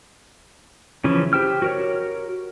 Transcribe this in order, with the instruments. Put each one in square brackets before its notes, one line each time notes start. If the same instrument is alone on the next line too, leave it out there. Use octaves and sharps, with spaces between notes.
[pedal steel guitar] C#3 E3 F3 C#4
G4 C5 G5 F6
F#4 A#4 C#5